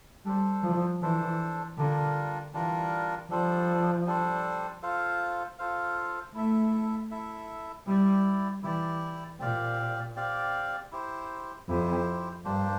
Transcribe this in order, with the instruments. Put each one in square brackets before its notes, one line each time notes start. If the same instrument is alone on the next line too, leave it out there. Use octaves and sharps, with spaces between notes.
[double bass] G3 [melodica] D4 A4 C5
[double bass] F3
[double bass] E3 [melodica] D4 A4 C5
[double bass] D3 [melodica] G3 D4 F4 A#4
[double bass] E3 [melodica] G3 D4 F4 A#4
[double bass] F3 [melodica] G3 D4 A4 C5
[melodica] G3 D4 A4 C5
F4 A4 C5 F5
F4 A4 C5 F5
[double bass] A3 [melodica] E4 A4 E5
[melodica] E4 A4 E5
[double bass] G3 [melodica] E4 G4 D5
[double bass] E3 [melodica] E4 G4 D5
[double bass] A#2 [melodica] C4 G4 D5 F5
[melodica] C4 G4 D5 F5
E4 G4 C5
[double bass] F2 [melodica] E4 G4 C5
[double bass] G2 [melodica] A#3 D4 G4 C5